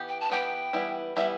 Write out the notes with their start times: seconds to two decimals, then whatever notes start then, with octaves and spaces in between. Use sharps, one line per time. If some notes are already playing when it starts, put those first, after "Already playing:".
Already playing: E3 B3 G4
0.09 G5
0.20 A5
0.30 E3 B3 G4 G5
0.73 E3 G3 B3 E4
1.16 E3 G3 B3 E4 E5